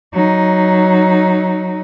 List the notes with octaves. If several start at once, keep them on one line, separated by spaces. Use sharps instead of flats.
F#3 D#4